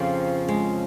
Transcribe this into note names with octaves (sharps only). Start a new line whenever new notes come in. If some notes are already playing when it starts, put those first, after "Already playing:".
Already playing: F2 C#3 F3 C4
G#3